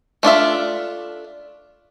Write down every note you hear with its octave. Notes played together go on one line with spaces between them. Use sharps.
A3 D4 F4 E5